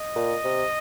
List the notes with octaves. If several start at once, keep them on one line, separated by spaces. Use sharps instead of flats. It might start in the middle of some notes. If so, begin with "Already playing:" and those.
Already playing: D#5
A#2
C3